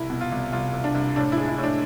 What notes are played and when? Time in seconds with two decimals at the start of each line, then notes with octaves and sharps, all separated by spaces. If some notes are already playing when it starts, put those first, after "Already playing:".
Already playing: C2 E4
0.10 B2
0.21 F4
0.32 C2
0.52 C2 F4
0.73 C2
0.84 D4
0.95 C2
1.16 A2 D4
1.32 E4
1.37 G#3
1.48 E4
1.58 A2
1.63 D4